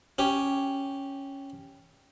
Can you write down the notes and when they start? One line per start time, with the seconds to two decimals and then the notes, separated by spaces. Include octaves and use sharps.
0.18 C#4 G4